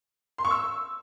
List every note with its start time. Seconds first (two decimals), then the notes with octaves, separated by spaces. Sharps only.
0.38 C6
0.45 C#6
0.51 E6